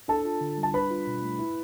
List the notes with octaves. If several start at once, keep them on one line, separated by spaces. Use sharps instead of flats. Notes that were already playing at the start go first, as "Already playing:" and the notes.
D4 A4 A5
F4
D3
G3
A5
D4 B4 B5
F4
B2
A3
E4